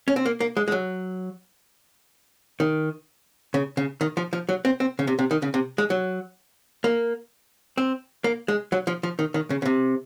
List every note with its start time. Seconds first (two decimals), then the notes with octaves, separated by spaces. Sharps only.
0.08 C#4
0.16 C4
0.26 A#3
0.40 A#3
0.57 G#3
0.68 G#3
0.72 F#3
2.60 D#3
3.54 C#3
3.77 C#3
4.01 D#3
4.17 F3
4.33 F3
4.49 F#3
4.65 C4
4.80 C4
4.99 C#3
5.07 C3
5.19 C3
5.31 D#3
5.42 C#3
5.54 C3
5.78 G#3
5.90 F#3
6.84 A#3
7.78 C4
8.24 A#3
8.48 G#3
8.72 F#3
8.87 F3
9.03 F3
9.19 D#3
9.34 D#3
9.50 C#3
9.62 C#3
9.66 C3